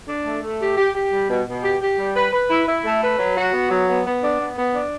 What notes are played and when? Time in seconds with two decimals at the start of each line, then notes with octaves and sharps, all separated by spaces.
0.08 D4
0.25 A3
0.42 A3
0.60 G4
0.77 G4
0.95 G4
1.11 G3
1.30 B2
1.47 B2
1.63 G4
1.81 G4
1.98 G3
2.16 B4
2.33 B4
2.50 E4
2.67 E4
2.84 A3
3.02 B4
3.19 F#3
3.37 F#4
3.53 B3
3.70 F#3
3.89 B3
4.06 B3
4.22 D4
4.40 B3
4.57 B3
4.74 D4